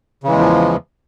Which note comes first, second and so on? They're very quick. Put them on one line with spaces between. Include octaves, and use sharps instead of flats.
C#3 E3 G#3 E2 F3